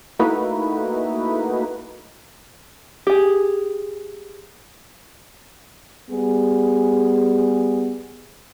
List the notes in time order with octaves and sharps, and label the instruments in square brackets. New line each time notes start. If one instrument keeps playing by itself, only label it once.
[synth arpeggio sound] A3 A#3 D#4 E4 F#4 B4
[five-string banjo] G4 G#4
[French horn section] G3 B3 G#4